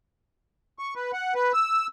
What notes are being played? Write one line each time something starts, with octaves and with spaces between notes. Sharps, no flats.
C#6
B4
F#5
B4
E6